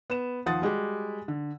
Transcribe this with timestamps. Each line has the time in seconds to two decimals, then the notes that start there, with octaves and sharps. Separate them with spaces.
0.10 B3 E7
0.46 D#2 F3 F4 F#5 D#6 A6
0.62 G3 G#3 F#4 G4
1.28 D3